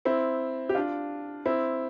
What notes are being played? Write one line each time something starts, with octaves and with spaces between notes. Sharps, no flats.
C4 E4
G4
D4 F4
C4 E4